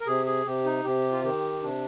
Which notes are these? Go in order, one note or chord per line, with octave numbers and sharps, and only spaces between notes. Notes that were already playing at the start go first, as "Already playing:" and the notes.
A#4
C3 G#4
G#4
C3 G4
D#4
C3 G4
F4
D#3 G4
C3 D4